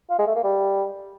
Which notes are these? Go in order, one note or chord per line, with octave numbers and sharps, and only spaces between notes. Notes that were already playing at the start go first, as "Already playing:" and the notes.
F4
G#3
A3
A#3
G3